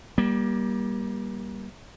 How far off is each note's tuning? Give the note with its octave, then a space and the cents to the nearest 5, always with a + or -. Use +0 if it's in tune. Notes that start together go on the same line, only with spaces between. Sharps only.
G3 +0 A#3 +30